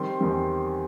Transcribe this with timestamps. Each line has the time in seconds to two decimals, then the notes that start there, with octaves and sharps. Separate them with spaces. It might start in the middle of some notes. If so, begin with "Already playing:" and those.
Already playing: D#3 G3 C4 C6
0.20 E2 D#3 G3 C4